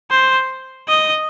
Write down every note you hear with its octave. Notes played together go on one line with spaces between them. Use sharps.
C5
D#5